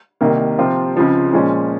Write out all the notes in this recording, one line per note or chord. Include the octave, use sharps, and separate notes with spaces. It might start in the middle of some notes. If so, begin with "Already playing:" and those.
C2 C3 D#3 A#3
C3 F3 C4 F4
C#2 C#3 F3 C4
A#2 F3 G#3 C#4